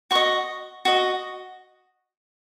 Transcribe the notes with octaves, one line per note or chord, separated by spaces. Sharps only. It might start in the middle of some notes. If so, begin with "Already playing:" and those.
F#4 D#5 C#6
F#4 D#5